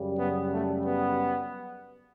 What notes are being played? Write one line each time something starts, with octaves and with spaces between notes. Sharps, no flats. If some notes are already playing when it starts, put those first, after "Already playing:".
Already playing: F#2 C#3 G3
B3
A3
B3